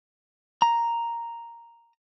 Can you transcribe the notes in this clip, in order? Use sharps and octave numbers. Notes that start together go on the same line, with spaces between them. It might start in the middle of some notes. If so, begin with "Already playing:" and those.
A#5